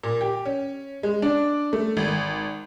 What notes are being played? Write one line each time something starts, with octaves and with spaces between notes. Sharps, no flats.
A#2
G4
C#4
G#3
D4
A3
G#1